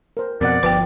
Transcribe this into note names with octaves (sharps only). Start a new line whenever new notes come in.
A#4 C5
F2 B2 A#4 D5 F#5
G1 F3 B4 G5 D6